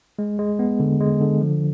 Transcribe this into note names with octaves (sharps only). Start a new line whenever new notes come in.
G#3
G#3
B3
D3
G#3
D3
F3